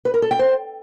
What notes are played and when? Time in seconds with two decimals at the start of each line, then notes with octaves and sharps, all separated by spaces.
0.05 B4
0.14 A#4
0.22 A4
0.31 G5
0.39 C5